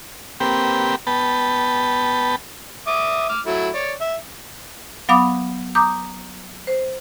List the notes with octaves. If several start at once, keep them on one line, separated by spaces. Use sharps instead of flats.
A#3 C4 G4 B4 G5
B3 B4 G5 A5
E5 D6 D#6
D6 F6
F#3 A3 E4
C#5 D5
E5
F#3 B3 F5 B5 D6 D#6
A#5 D6 D#6 G6
C5